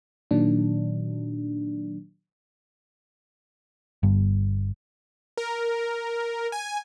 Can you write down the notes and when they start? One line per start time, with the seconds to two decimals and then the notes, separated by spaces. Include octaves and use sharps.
0.31 A#2 D#3 F#3 D4
4.03 G1 G2
5.37 A#4
6.52 G#5